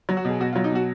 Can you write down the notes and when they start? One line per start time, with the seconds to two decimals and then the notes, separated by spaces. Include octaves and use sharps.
0.09 F#3
0.17 F#4
0.25 B2 G#4
0.40 B2 F#4
0.53 F4
0.56 F#3
0.64 D#4
0.71 B2 F#4